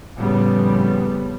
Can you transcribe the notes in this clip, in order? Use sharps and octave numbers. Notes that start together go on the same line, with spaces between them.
F2 A2 C#3 G3 B3